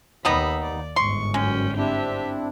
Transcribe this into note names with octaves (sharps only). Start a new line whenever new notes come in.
D#2 G3 B3 D#4 B5 E6
D5
G1 G#2 C6 C#6
F#2 G#3 C#4 G5
C4 D4 E4 G4 E5